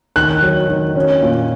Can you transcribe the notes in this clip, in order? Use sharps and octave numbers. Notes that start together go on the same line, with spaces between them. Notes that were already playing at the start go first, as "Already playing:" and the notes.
D#3 F#6
F#3
D#3
C#4
A#2